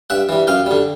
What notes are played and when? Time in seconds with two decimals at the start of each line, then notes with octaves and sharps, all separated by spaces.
0.10 G2 E5 F#5
0.29 E3 G3
0.47 F#2 F5 G5
0.66 D3 G3